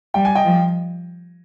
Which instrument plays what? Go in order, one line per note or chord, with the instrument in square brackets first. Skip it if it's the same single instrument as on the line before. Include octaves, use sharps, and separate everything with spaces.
[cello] G3 [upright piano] G5
[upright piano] G#5
D#5 G5
[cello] F3